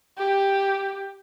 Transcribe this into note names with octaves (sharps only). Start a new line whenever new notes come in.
G4